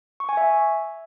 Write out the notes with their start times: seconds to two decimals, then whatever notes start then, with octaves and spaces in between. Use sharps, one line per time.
0.20 C#6
0.29 G#5
0.37 E5